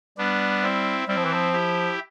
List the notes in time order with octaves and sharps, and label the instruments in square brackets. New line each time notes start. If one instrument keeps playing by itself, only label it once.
[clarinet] G3 [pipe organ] B3 D4
[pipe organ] C4 E4
[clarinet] G3 [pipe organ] C4 E4
[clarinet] F3
E3
F3
[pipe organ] E4 G4